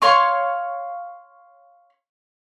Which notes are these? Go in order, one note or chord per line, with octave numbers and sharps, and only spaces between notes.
C#5 F5 C6 C#6